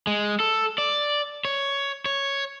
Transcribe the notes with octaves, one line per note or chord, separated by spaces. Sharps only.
G#3
A4
D5
C#5
C#5